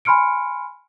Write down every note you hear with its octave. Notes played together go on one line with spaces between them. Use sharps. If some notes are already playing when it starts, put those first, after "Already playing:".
G#5 B5 C6 F6 C#7 D7